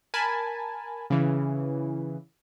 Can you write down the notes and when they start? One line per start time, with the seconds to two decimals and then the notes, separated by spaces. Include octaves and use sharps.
0.14 A#4 G#5 A5 B5
1.10 C#3 E3